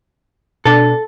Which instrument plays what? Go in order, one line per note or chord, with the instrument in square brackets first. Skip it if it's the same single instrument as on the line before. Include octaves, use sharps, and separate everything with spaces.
[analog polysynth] B2 D4 [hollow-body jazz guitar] A4